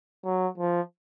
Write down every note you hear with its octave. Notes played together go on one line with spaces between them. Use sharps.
F#3
F3